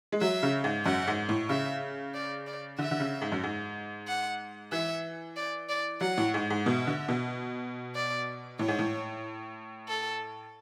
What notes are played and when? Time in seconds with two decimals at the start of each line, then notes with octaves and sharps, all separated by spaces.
0.12 G#3
0.21 F#3 E5
0.43 C#3
0.64 G#2
0.85 F#2 F#5
1.07 G#2
1.29 A2
1.49 C#3 E5
2.14 D5
2.47 D5
2.78 D3 E5
2.91 D3
3.00 C#3
3.21 G#2
3.32 F#2
3.43 G#2
4.07 F#5
4.72 E3 E5
5.37 D5
5.69 D5
6.01 F#3 F#5
6.17 A2
6.34 G#2
6.50 G#2
6.66 B2 E5
6.87 D3
7.09 B2
7.95 D5
8.59 A2 C#5
8.68 G#2
8.79 A2
9.88 A4